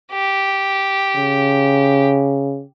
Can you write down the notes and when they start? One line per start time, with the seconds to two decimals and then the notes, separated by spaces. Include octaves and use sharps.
0.12 G4
1.17 C#3